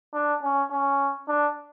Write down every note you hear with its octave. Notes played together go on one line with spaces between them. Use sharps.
D4
C#4
C#4
D4